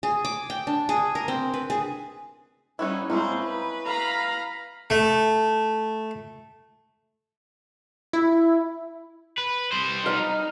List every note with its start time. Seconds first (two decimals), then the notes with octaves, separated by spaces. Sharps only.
0.03 G#4
0.25 D6
0.50 G5
0.67 D4
0.89 G#4
1.15 A#4
1.28 C4
1.54 B4
1.70 G#4
2.79 G3 C#4 D#4 E4 F#4 C#5
3.10 G#3 A#3 C4 C#4 D#4 E4 C5
3.42 B4
3.87 F5 A#5 B5
4.90 A3
8.13 E4
9.38 B4
9.72 G3 C5
10.06 D#4 F5